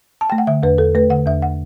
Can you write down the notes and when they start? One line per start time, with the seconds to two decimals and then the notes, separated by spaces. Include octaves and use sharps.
0.21 A5
0.30 A3 G5
0.38 F#5
0.47 D3 E5
0.63 E2 B4
0.78 E2 A4
0.95 A3 B4
1.10 D3 F#5
1.26 E2 E5
1.42 F#5